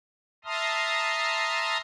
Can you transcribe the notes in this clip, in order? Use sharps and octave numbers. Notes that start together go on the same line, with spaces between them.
E5 A5 A#5 C6 D#6 F6